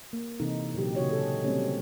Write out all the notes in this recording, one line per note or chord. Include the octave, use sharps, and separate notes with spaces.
A#3
C3 E3 D#4 A4
A#2 D3 F#3 G4
C#3 F#4 C#5 D#5
G#4 A4
G3 G#3 A#3 C4 C#4 G4